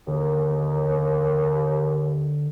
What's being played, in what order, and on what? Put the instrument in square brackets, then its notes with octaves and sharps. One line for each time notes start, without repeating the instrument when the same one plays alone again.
[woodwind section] D#2 [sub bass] D3